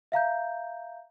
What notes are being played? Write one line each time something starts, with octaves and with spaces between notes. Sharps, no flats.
E5 F5 A#5 G6